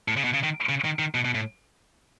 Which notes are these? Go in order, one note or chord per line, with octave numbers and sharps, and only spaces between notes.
A2
C#3
B2
C#3
D#3
C#3
D#3
D#3
B2
B2
A2